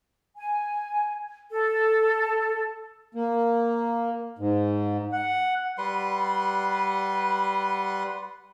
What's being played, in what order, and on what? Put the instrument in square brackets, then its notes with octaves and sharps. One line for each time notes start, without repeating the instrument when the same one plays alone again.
[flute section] G#5
A4
[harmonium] A#3
G#2
F#5
[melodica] G3 B4 F#5 C6